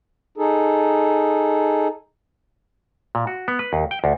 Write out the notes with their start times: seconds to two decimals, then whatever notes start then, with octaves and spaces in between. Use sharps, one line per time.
0.37 D#4 G#4 A4
3.15 A#2
3.27 F#4
3.48 B3
3.59 B4
3.73 D#2
3.91 G5
4.04 D2